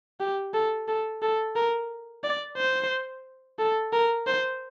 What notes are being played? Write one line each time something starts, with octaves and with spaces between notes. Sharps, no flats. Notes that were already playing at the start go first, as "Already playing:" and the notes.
G4
A4
A4
A4
A#4
D5
C5
A4
A#4
C5